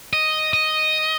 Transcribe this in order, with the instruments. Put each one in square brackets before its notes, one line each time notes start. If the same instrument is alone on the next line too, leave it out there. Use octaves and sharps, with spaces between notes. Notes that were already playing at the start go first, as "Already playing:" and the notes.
[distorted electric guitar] D#5
D#5